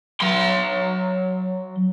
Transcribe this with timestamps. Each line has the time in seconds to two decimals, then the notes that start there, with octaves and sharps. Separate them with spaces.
0.21 F#3 C6